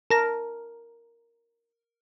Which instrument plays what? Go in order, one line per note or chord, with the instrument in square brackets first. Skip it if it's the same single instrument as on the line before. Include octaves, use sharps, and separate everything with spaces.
[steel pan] A#4 [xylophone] A5 A#6